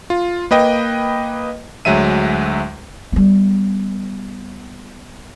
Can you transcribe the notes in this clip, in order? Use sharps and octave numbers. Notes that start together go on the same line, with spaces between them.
F4
A#3 B4 D#5 G5
D2 F#3 G#3 E5 D#7
G3 B3